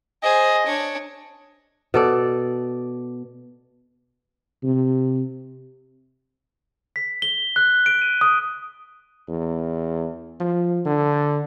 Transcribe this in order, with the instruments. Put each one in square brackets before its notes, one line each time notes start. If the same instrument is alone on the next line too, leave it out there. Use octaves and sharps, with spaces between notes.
[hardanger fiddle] G#4 C5 [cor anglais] D#5
[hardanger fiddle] D4 C#5
[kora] B2 A4 D5
[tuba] C3
[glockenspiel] B6
G7
F#6
D7
D#7
D#6
[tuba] E2
F3
D3